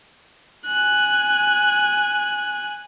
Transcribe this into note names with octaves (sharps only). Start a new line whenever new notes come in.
G#5 F#6